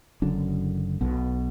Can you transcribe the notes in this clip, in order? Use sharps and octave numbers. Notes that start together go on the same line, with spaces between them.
F#1 F#2 D3 D4
B1 B2